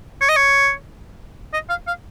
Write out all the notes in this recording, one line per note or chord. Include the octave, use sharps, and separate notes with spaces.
C#5
D#5
C#5
D#5
F5
F5